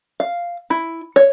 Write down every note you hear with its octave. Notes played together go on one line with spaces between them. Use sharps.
F5
E4
C#5